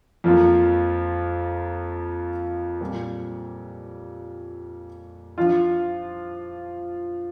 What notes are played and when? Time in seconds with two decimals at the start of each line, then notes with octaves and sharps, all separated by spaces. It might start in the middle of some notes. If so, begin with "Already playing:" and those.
0.24 F2 F3 A#3 F4
2.81 A#2 G3 C4 G4
5.38 F3 D4 F4